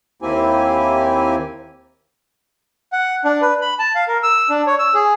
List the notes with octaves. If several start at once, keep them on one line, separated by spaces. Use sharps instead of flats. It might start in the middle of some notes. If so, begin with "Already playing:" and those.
D#2 A#3 C4 E4 G4 G#5
F#5
D4
B4
B5
A5
F5
A#4
E6
D4
C#5
E6
G#4